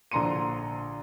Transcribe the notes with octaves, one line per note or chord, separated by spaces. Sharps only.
A#1 D3 A#5 C6 C#7 D#7